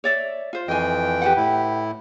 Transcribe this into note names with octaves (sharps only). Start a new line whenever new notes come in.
C#5 D5 E5
F4 C5
F2 E3 D#5 G5 G#5
G4 B4 F#5
A2 E4